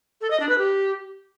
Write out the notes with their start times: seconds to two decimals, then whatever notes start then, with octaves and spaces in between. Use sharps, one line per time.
0.21 A4
0.31 D#5
0.40 D4
0.49 B4
0.58 G4